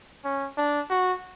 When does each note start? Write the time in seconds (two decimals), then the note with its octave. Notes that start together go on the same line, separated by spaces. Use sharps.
0.25 C#4
0.58 D4
0.90 F#4